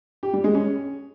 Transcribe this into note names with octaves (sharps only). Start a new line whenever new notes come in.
G4
G3
G#3
C#4